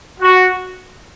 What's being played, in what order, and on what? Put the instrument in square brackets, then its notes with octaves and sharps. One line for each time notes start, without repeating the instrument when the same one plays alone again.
[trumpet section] F#4